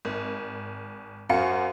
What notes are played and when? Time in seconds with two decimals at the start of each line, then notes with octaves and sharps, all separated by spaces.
0.05 G#1
1.29 F#2 F#4 C5 F5 C#7